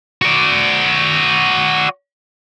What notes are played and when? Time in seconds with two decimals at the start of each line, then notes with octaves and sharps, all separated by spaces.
0.22 F#4 D5